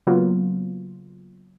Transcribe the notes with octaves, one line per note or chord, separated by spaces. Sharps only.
C#3 F#3 A#3 B3 F4